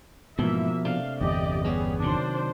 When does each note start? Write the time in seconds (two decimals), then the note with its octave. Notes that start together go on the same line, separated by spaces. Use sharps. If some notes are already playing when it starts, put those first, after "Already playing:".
0.39 G#2 B2 E3 F3 A#3 E5
0.85 C3 A3 D4 F5
1.21 G1 E2 G4 D5 D#5
1.65 G3 B3 C#4 G4 G#4
2.03 C3 D#3 F#3 D4 C5